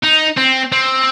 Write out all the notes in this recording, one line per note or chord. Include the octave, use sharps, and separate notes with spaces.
D#4
C4
C4